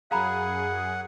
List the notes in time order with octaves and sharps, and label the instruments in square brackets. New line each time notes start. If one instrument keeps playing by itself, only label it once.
[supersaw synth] F#2 G#4 [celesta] F5 A#5 B5 [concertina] F#5